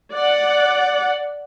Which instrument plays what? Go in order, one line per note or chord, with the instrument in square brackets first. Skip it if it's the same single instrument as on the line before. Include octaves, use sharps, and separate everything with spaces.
[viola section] D5 F#5